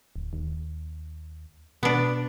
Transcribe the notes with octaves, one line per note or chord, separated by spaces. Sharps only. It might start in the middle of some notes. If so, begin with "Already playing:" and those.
D1
D#2
B2 B3 D4